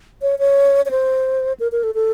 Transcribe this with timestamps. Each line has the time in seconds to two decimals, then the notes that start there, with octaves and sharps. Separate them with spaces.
0.22 C#5
0.39 C#5
0.86 C#5
0.91 C5
1.60 A#4
1.72 A#4
1.83 A4
1.95 A4